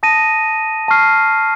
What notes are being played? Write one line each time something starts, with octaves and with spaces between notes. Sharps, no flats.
A5 D#6 A#6 D#7
A5 C#6 F6 C7